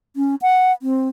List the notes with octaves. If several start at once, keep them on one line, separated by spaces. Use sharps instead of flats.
C#4
F#5
C4